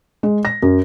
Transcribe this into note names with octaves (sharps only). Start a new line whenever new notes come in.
G#3
A#6
F#2